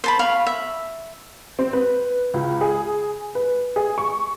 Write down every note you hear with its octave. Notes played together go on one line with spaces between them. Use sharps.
C5 A5 B5
F5 B5 C#6
E5
C4
B4
C#2
G#4
B4
G#4
C#6